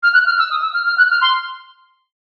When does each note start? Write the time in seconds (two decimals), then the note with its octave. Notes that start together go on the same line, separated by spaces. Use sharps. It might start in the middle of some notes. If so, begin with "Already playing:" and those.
0.03 F6
0.14 F#6
0.26 F6
0.39 E6
0.51 D#6
0.62 E6
0.74 F6
0.87 F6
0.98 F#6
1.11 F6
1.21 C6